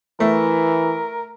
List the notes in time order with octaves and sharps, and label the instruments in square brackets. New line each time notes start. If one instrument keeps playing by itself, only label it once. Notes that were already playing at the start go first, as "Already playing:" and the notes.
[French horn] E3 [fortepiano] A3 [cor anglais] A#4